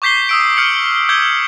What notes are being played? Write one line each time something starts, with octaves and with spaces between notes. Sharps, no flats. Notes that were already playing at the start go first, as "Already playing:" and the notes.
C#6 D6 G6 B6 C7 G7
D#6 E6 D7
F6 G6 C#7 F#7
D6 E6 G6 G#6 G7